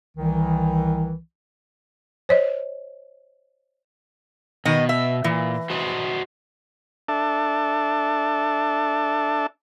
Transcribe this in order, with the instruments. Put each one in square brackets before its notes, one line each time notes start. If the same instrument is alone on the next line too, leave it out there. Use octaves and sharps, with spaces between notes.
[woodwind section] C2 D#3 E3
[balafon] C5 C#5 D#5
[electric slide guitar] B2 [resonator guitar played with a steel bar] D#3 D#5
[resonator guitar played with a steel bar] E5
[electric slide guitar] A#2 [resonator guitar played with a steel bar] E3
[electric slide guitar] F#4 C5 D#5
[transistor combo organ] D4 A4 E5 A5